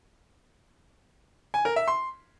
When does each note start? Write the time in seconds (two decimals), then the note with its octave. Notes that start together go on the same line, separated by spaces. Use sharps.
1.54 G#5
1.65 A#4
1.76 E5
1.88 C6